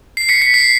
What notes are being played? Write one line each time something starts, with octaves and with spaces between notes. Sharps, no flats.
C7
B6 C#7
B6 C#7
C7